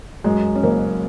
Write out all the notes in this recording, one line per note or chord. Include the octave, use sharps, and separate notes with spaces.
F#2 G#3
C#4
F#1 A#3